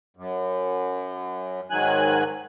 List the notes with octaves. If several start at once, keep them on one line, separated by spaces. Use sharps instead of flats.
F#2
G#2 D#3 F#3 G#5 F#6